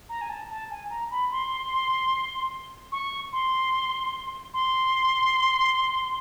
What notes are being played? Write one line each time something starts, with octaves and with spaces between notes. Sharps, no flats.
A#5
G#5
A5
A5
G#5
A#5
B5
C6
C#6
C6
C6